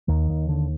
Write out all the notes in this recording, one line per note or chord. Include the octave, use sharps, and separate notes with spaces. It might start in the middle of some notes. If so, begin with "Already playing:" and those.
D#2 D#3
D#2
D3